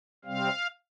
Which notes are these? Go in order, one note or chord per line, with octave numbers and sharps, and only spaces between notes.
C3 G3 C4 F5